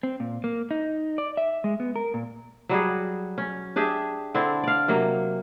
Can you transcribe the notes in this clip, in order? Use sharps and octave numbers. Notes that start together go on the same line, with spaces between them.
C4
A#2
A#3
D#4
D5
E5
G#3
B3
A#4
A#2
F#3 G3 F#4 G#4
C#4
D4 G4 G#4 E5
D3 C4 D4 E4
D5 F5
C3 F#3 A#3